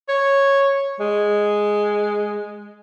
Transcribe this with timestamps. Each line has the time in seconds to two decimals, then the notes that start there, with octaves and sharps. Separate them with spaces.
0.08 C#5
1.00 G#3